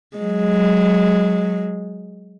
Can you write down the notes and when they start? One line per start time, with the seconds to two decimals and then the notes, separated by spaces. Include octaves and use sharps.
0.17 F#3 G#3